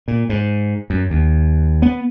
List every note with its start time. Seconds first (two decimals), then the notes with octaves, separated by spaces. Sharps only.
0.08 A#2
0.29 G#2
0.90 F#2
1.10 D#2
1.82 B3